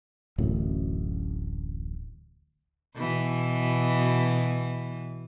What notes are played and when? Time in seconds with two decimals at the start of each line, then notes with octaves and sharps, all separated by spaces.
0.38 D1 A1 F#2
2.95 B2 E3